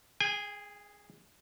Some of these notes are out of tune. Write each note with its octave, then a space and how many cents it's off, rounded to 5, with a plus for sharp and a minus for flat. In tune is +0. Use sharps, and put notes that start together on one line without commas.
G#4 +0 G#5 -45